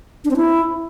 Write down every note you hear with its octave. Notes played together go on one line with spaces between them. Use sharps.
D4
C4
E4